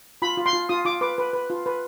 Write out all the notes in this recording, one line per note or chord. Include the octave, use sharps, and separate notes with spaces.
F4 B5
F4
C6
F4
F4 D#6
F4 D6
B4 D6
B4
B4
F4
B4